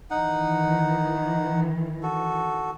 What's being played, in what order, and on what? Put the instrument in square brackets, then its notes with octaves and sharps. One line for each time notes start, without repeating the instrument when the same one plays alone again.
[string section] D#3 E3 [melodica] D#4 F#5
[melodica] F#4 A4